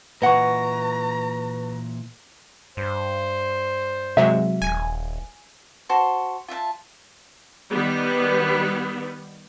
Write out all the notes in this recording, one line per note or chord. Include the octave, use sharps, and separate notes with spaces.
A#2 E3 B4 D#5 F#5 A#5 C#6
G2 C5
C3 F#3 G#3 E5
D#1 G#5
F#4 C5 A5 C6
F4 E5 F#5 A5
D#3 G3 B3